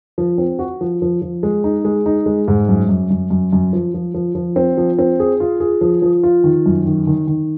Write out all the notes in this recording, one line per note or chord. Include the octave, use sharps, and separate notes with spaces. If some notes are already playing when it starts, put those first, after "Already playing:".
F3
C4
F#4
F3
F3
F3
G#3
D#4
G#3
D#4
G#3
G#2
F#2
F#2
F#2
F#2
F#2
F3
F3
F3
F3
C4
F3
C4
G#4
F4
G#4
F3
F3
F4
D#3
F#2
D#3
D#3
D#3